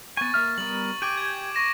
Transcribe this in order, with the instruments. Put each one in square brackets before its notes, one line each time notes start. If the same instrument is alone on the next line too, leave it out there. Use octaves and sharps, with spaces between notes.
[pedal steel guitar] B3 G#5 [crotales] C#6 A6
[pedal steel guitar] A#3 E5 F6
[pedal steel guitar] G3 B3 A#4 [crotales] F#7
[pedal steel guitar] G4 G5 G#5 [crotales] D6 D7 D#7
[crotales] G#6
C#6 A#6 E7